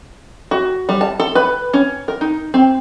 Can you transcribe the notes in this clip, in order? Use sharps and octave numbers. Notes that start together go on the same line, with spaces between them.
F#4
G3
A5
A4
B4
C#4
A#4
D#4
C4